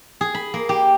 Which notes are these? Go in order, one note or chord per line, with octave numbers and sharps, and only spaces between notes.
G#4
B5
A#3
G4